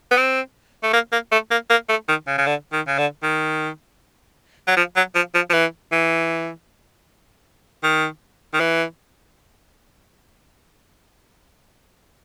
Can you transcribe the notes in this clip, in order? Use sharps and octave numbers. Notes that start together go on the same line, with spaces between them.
B3
C4
A3
A#3
A#3
A3
A#3
A#3
A3
D#3
C#3
C#3
D3
D#3
C#3
D3
D#3
F#3
F3
F#3
F3
F3
F3
E3
E3
D#3
D#3
E3